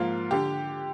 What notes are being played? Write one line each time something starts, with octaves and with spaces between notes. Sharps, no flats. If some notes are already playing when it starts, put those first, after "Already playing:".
Already playing: G#2 F3 A#3 F4
D3 G4